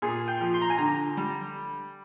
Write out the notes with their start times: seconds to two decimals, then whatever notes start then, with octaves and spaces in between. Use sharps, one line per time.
0.02 A#2 G#4
0.28 G5
0.41 F3
0.54 C6
0.62 A#5
0.70 G#5
0.78 D3 A#5
1.17 G3